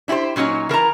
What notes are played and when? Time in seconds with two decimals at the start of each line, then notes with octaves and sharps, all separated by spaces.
0.08 D4 E4 F#4 G4 C5
0.36 A#2 F#3 C#4 D#4 C#5
0.69 E3 A#4 A5 A#5